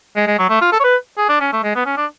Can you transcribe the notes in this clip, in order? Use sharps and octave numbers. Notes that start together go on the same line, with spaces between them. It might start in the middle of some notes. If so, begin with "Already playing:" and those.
G#3
G#3
F#3
A3
F4
A4
C#5
B4
G#4
D4
C#4
A3
G#3
B3
C#4
D4